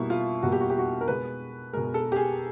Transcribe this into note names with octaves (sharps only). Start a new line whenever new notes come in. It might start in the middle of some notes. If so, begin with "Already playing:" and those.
Already playing: B2 G3 A#3 E4
F4
B2 G3 A#3 F#4
G4
F#4
G4
F#4
A#4
B2 G#3 B4
B2 G#3 A#4
A4
G4
G#4